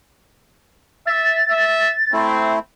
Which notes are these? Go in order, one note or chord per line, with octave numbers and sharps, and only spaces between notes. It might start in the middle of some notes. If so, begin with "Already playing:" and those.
E5 A6
E5
A3 C4 E4